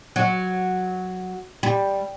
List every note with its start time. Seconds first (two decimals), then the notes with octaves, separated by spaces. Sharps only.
0.16 F#3
1.63 G3